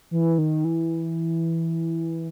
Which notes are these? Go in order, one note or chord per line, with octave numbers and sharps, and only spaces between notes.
E3
D#3
E3